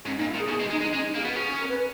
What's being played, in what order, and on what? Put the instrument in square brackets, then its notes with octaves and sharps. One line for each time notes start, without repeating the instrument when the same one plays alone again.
[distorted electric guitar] G#2 [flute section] C#4
[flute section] D#4
[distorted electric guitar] A#2
[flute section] E4
[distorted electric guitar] A#2
[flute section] G#4
[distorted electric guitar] B2 [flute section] G#4
[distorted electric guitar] G#3
[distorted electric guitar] G#3 [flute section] D#4
[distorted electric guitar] G#3 [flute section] D#4
[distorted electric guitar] G#3 [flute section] C#4
[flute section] D#4
[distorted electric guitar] A#3 [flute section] G#4
[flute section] F#4
[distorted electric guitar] B3
[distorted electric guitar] C#4 [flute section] G#4
[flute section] G#4
A#4
B4